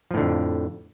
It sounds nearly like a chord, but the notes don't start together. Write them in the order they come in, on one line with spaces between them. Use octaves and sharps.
F3 A2 D3 F2